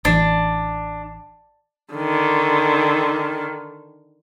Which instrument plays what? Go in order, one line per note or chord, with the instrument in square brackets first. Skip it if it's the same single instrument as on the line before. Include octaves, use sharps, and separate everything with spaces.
[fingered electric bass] A1 E3 [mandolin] D4
[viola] D3 D#3